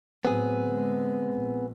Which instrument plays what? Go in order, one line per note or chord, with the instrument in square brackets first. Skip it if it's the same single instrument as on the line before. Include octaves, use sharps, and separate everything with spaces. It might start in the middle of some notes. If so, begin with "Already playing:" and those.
[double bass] A2 F#3 [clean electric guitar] B3 C4 G#4
[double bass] D3 G#3
A#1